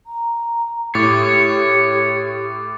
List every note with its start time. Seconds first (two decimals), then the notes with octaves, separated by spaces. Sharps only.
0.07 A#5
0.95 A2 G4 C#5 D6 A6